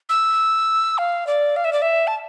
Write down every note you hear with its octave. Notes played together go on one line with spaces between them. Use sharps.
E6
F5
D5
F5
E5
D5
E5
A5